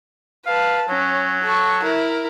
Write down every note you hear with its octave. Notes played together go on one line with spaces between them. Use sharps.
B4 F5 A5
F#3 C#4
A4 C#6
E4 A#4